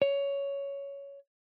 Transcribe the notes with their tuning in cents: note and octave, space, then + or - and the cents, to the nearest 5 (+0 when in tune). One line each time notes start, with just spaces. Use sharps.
C#5 +10